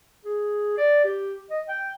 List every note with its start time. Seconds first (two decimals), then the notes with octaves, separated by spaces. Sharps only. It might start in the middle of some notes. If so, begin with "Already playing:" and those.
0.25 G#4
0.78 D5
1.04 G4
1.50 D#5
1.68 G5